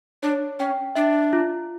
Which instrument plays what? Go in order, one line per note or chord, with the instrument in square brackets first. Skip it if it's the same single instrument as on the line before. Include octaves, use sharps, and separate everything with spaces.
[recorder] D4 [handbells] C#5
[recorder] C#4 [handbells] G5
[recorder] D4 [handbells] E5
[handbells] F4